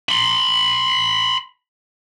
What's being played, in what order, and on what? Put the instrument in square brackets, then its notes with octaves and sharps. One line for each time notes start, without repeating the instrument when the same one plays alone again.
[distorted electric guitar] B5 C6